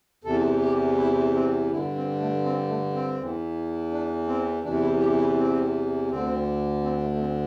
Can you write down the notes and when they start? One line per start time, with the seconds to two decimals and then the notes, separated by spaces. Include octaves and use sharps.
0.24 E2 C3 E3 A4
0.62 G4
0.98 E4
1.34 C4
1.71 G2 D3 E4
1.95 C4
2.20 A3
2.44 C4
2.68 A3
2.93 C4
3.18 E2 E3
3.91 D4
4.27 C4
4.63 E2 C3 E3 D4
4.82 E4
5.00 G4
5.18 E4
5.37 C4
6.10 D2 D3 C4
6.83 C4
7.02 A3
7.14 A3
7.20 C4